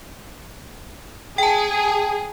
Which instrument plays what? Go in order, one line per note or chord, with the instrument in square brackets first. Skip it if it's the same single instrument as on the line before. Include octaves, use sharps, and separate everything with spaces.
[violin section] G#4 [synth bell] G5 A5